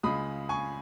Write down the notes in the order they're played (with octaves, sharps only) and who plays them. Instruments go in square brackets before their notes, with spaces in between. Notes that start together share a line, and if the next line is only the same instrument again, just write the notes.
[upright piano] C#2 C#3 G#3 B5 D#6
G#5 C#6